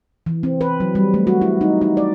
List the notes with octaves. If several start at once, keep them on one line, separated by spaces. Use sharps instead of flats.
E3
C4
B4
F#3
G3
A3
F#4
E4
D#4
D#4
D5